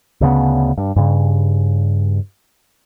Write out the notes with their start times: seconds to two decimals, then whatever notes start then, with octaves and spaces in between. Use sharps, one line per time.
0.21 D2 C#3 B3
0.78 G2
0.96 G2 C#3